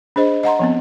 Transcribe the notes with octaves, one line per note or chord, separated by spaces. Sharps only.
D4 G#4 C5 D#5
D#5 F#5 A#5 C6
F3 B3 C4